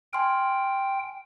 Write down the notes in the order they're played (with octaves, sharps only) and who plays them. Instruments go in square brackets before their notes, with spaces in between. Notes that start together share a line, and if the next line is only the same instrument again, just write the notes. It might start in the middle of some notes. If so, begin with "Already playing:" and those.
[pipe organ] G5 [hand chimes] G#5 C6 F6